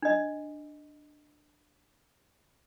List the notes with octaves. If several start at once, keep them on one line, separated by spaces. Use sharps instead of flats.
D4 D#5